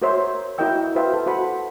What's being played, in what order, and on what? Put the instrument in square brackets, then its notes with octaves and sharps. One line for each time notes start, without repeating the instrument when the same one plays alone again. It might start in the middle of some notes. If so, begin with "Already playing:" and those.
[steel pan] F#4 A#4 C5 C#5 E5 C6
E4 F#4 A#4 D#5 G5 E6
F#4 B4 C5 E5 F5 G5
A4
F#4 C5 F#5 B5